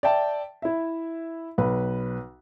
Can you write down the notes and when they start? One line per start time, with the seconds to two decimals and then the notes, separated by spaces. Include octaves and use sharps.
0.03 D5 E5 G5 A5
0.62 E4 E5
1.58 B1 B4